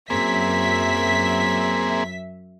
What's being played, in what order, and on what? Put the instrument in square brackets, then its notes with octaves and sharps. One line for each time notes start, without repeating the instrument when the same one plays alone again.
[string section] F#2 E5 B6 [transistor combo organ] A#3 C4 G#4